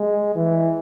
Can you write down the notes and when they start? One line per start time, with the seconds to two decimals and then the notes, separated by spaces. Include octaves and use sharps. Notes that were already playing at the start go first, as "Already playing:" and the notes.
Already playing: G#3
0.36 E3